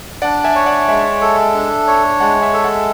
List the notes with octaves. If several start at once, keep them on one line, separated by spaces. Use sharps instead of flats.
D4 D5 F#5
E5 G#5
C#5
D5 F#5
G#3 E5 G#5
A4
D4
C#5
G#3 F#5 A5
E5 G#5
A4
F#5 A5